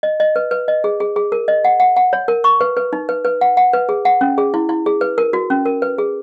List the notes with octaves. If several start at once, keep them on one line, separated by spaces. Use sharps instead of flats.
D#5
D#5
B4
B4
D#5
G#4
G#4
G#4
A#4
D#5
F#5
F#5
F#5
C#5
A#4
C#6
B4
B4
D#4
B4
B4
F#5
F#5
B4
G#4
F#5
C#4
G#4
E4
E4
G#4
B4
A#4
F#4
C#4
A#4
B4
G#4